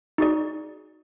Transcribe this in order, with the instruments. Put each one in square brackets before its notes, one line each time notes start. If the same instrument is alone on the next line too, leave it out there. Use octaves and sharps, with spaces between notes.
[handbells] D#4 F#4 G#4 D5